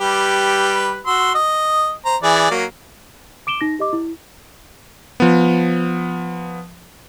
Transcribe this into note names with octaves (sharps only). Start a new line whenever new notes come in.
G3 G4 B4
F#4 C6 E6
D#5
C5 A#5
E3 G#4 D5
F#3 A#3
D6 D7 E7 G7
D#4 A#6
G4 D#5 D6
E4
F3 B3